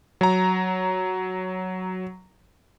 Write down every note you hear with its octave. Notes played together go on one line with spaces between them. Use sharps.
F#3 A#5